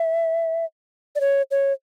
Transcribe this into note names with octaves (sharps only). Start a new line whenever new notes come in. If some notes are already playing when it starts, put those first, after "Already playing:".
Already playing: E5
D5
C#5
C#5